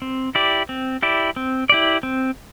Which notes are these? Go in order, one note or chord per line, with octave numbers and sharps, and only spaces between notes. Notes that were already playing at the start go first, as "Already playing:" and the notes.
C4
E4 G4 D5
C4
E4 G4 D5
C4
E4 G4 D5
C4